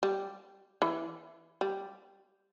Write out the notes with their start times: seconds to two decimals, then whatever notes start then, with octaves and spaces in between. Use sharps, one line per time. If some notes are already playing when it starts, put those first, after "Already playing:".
0.03 G3
0.82 E3
1.61 G3